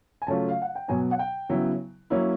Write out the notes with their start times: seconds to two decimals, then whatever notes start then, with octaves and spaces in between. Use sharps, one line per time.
0.22 G#5
0.27 C#3 F#3 A3 C#4 F4 A5
0.49 F5
0.62 F#5
0.76 G5
0.88 B2 F#3 B3 G#5
1.11 F#5
1.19 G5
1.49 C#3 F#3 B3 E4
2.10 F#3 A#3 C#4 E4